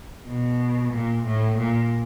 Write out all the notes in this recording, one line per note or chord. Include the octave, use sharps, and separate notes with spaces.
B2
A#2
A2
A#2